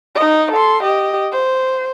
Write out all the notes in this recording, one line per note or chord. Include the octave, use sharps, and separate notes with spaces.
D#4 D#5
A4 C6
G4 D#5
C5